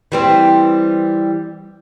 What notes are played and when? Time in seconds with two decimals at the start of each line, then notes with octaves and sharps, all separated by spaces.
0.12 E3 G3 C4